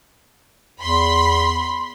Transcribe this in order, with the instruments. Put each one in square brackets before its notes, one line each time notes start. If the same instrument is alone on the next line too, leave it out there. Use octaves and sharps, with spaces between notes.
[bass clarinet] E2 [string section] B5 C6